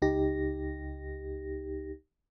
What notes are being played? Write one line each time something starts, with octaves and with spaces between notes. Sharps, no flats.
C#2 D#4 G4 A#6